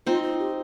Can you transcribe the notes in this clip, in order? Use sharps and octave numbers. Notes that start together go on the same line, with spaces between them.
C4 D#4 F4
F4
G4